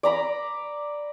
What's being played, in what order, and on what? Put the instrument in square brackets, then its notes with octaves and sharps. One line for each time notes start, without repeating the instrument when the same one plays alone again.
[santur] D5 A#5 B5